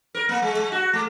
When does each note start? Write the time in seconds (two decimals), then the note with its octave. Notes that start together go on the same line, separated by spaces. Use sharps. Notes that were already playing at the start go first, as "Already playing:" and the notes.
0.15 A#4
0.29 A#3
0.42 G#3
0.57 G#3
0.72 F#4
0.93 A3